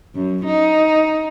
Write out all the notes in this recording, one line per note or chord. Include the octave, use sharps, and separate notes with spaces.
F#2
D#4